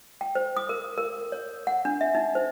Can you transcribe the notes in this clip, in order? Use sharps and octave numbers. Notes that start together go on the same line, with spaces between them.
G5
C5
D#6
A#4
A#4
C#5
F#5
D4
E5
D#4
C5